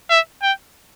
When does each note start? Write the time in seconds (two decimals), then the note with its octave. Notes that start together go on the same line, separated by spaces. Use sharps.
0.10 E5
0.43 G5